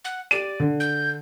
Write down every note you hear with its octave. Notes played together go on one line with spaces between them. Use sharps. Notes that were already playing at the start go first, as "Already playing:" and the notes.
F#5
G4 D5 D#7
D3
G6